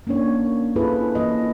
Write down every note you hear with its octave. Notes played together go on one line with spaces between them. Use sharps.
A#3 C#4 D4 C#5
C4 E4 F4 G#4 A4 B4
E3 A#3 F4 D#5